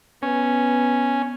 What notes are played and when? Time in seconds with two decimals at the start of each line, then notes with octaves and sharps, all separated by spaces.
0.22 B3 C#4